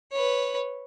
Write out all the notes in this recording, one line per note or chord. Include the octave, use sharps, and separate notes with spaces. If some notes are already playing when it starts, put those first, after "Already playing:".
B4 C#5